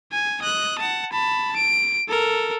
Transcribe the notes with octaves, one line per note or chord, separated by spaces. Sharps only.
G#5
D#5 F#6
F#5 A5
A5 B5
D7
A4 A#4